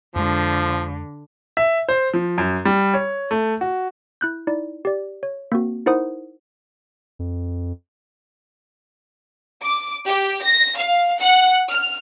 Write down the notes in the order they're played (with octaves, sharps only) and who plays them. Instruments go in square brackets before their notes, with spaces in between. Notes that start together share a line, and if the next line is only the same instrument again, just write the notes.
[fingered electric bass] F2 G#3 [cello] D3 [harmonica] F3
[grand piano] E5
C5
F3
F#2
G3
C#5
A3
F#4
[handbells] E4 F#6 G6
D#4 E4 D5
G4 D5
C#5
A#3 C4 F#4
D#4 E4 A#4 C5 F#5 D#6
[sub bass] F2
[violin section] D6
G4
A#6
F5
F#5
F6